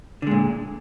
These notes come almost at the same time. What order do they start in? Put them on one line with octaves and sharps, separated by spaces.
D3 G#3 A#2